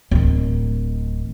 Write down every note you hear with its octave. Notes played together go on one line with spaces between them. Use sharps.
D1 D#3